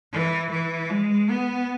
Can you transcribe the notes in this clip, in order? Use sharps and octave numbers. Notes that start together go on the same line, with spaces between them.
E3
E3
G#3
B3